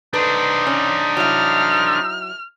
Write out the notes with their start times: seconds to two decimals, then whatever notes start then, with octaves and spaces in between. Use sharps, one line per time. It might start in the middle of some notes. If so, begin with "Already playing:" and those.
0.14 D4 D#4 B4 C5
0.67 C#4
1.17 F#3 E4 F6